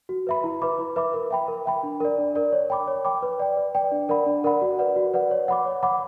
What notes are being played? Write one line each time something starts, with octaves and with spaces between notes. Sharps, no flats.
F#4
B4 E5 B5
E4
B4 E5 B5 D6
E4
B4 E5 B5 D6
A#4
E5 G5 B5
A#4
E5 G5 B5
D4
A#4 D5
D4
A#4 D5
C#5
G5 B5 D6
C#5
G5 B5 D6
B4
D5 G5
B4
D5 G5
D4
A#4 D5 F#5 B5
D4
A#4 D5 F#5 B5
F#4
B4 D5 F#5
F#4
B4 D5 F#5
C#5
F#5 B5 D6
C#5
F#5 B5 D6